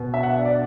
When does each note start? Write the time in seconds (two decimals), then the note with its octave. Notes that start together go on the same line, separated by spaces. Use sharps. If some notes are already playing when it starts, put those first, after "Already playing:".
Already playing: B2
0.14 E5
0.23 F#5
0.37 D4
0.45 D5